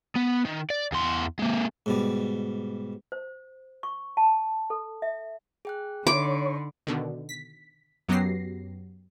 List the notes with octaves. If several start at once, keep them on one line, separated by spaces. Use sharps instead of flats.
B3
D#3
D5
E2 C6
G#3 A#3
G#2 B2 G3
C5
C#6
A5
A4
E5
G#4 G5 F#6
D3 D#4 C#5 B5 C6 D6
B2 D3 D#3
B6
F#2 F#3 B3 G4 A#6 C7